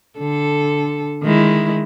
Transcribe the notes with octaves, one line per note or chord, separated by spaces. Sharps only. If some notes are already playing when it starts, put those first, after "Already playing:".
D3 A4
D#3 G#3 E4